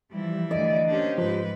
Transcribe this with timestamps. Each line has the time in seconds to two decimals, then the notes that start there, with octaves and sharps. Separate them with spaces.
0.11 E3 F3 G3 E4
0.51 D2 D5 D#5
0.87 A#3 C#4 D4 G4 C5
1.18 G#2 F3 B4